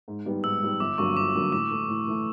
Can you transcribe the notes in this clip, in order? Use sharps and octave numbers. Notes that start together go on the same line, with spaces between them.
G#2
D#3 G3 B3
G#2 E6
D#3 G3 B3
G1 D6
G2 D3 F#3 A#3 C#6
G1 D6
G2 D3 F#3 A#3
A2 D6
E3 A3
A2
E3 A3